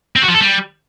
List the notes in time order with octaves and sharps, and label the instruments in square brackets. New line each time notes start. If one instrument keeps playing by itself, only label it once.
[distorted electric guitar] C4
F#4
F3
A4
G3